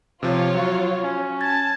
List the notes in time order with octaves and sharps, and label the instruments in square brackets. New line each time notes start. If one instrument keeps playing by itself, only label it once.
[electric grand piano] C3 F3 [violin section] F4 C#5
[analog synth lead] F#3 [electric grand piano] F#4
[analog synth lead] C#4
[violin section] A5 [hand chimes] G#6 A6